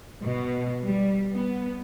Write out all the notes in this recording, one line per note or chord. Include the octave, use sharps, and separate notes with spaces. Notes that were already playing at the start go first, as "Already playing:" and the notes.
B2
G3
B3